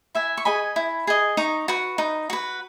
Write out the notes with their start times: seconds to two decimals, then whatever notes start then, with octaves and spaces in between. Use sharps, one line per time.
0.15 E4 E5 G#5
0.37 C#6
0.45 G#4 D#5 G#5 B5
0.76 E4
1.07 G#4 D#5
1.37 D#4 A#5 C#6
1.68 F#4 B4
1.98 D#4
2.30 F#4 B4